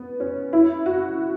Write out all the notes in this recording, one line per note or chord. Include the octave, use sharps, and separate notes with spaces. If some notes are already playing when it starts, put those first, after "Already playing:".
Already playing: B3
C#4
E4
F#4